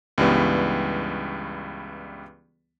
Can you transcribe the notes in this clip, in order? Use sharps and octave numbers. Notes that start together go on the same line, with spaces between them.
C#2 G2 E3 G3 B3